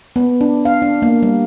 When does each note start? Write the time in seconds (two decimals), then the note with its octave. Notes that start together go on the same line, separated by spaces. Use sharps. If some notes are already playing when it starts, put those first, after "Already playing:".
0.16 B3
0.41 D4
0.65 F5
0.82 D4
1.02 A#3
1.23 G3